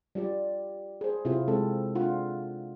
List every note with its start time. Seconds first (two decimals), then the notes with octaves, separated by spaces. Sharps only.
0.15 G3 F4 G4 D5
1.01 G#4 C5
1.25 C3 E4 F4 C5
1.48 G#3 C4 A4
1.95 D4 F4 F#5